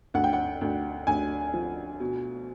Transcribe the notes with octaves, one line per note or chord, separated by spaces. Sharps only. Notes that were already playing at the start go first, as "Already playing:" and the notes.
D2 F#5
G5
F#5
D2
D2 G#5
F3
B2